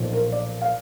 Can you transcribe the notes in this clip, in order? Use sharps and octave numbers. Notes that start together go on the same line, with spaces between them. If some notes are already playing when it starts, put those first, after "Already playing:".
Already playing: B1 A#2 F3
A#4
D5
F5